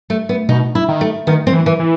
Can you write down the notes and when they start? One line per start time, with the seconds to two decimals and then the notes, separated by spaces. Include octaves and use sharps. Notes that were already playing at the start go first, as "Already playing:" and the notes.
0.10 A3
0.29 B3
0.49 B2 D#4
0.75 E4
0.88 D#3
1.01 A3
1.27 D#3 B3
1.47 C4
1.53 E3
1.66 E3
1.79 E3